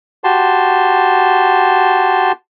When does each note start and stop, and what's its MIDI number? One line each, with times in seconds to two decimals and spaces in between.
0.24 2.32 66
0.24 2.32 67
0.24 2.32 81
0.24 2.32 84